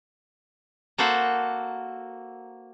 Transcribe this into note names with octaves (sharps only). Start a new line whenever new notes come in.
A#3 F#4 A4 C5 B5